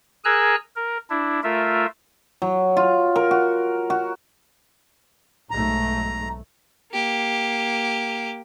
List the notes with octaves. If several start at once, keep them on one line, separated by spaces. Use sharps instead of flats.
G#4 A#4 G#5 A#5 E6 F#6
A#4
D4 E4
A3 F4 A#4 E5
F#3
F4
A#4
F#4
F#4
B1 G#2 A3 A#5
A#3 G4